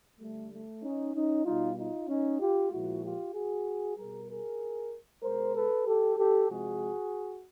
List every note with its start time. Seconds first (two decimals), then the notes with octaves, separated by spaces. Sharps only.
0.20 D3 G3 A3
0.51 A3
0.83 C#4 D#4
1.14 C#4 D#4
1.46 B2 G3 D#4 F4
1.77 D#4 F4
2.08 C#4 D#4
2.40 F4 G4
2.71 A#2 F3 G#3 E4 F#4
3.03 F4 G4
3.34 F#4 G#4
3.97 B2 G3 G#4 A#4
4.29 G#4 A#4
5.23 B2 G#3 A#4 C5
5.54 A4 B4
5.86 G4 A4
6.18 G4 A4
6.49 C3 F3 G#3 F#4 G#4